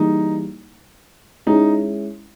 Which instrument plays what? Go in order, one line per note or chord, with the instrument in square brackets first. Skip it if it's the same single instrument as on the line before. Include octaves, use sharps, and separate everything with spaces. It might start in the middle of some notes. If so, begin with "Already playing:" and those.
Already playing: [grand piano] E3 G3 A#3 E4 G#4 [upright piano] D#4
[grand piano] G#3 C#4 E4 G#4 [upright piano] D#4